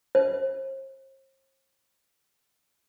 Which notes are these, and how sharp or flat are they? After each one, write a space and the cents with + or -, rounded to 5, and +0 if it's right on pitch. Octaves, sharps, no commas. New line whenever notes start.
C5 +40